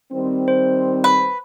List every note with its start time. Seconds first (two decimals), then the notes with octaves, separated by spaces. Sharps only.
0.13 D#3 G3 C4
0.48 C5
1.04 B4